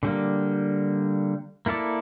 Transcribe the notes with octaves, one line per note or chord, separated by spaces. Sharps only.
D3 G3 A#3
A#3 E4 A4 D5